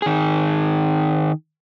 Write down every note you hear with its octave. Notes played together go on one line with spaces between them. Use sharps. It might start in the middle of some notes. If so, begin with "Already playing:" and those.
D#3 G#4